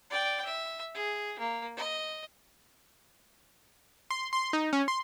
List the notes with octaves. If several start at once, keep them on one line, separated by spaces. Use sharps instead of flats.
D5 G5
E5
G#4
A#3
D#5
C6
C6
D#4
C#4
C6